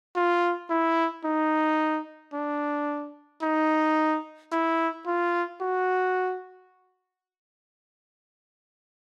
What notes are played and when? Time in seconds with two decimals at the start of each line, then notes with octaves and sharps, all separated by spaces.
0.16 F4
0.70 E4
1.25 D#4
2.33 D4
3.42 D#4
4.51 E4
5.06 F4
5.61 F#4